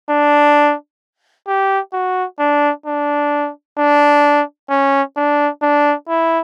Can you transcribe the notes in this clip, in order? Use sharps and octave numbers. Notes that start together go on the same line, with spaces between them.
D4
G4
F#4
D4
D4
D4
C#4
D4
D4
E4